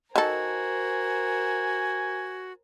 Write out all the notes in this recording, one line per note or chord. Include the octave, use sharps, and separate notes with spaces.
D#3 F#4 A4 A#4 C5 G#5